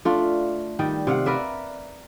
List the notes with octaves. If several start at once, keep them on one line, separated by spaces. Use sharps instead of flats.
A3 D4 F4
D#3 G3
C3 F5 F#5
A#4 B4 D5 E5